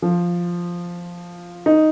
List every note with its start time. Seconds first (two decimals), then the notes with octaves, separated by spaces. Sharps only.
0.02 F3
1.66 D#4